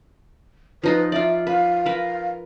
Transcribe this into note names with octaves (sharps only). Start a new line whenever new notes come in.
F3 D#4 F4 B4
F4 D5 E5
B4 F5
A#4 B4